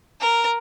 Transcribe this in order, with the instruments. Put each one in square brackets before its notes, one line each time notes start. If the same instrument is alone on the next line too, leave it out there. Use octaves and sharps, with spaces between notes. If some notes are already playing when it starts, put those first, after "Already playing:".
[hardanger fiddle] A#4